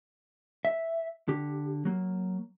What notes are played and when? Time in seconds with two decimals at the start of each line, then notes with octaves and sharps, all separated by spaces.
0.65 E5
1.28 D3 G4
1.85 F#3 A#3